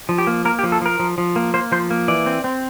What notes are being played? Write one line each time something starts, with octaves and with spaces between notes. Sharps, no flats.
F3
G4
A#3
A#3 A#4
G4
F3
A4
F3 A#4
F3
F3
A#3
A#3 C5
F3 C5
A#3
E3 D5
C4
C4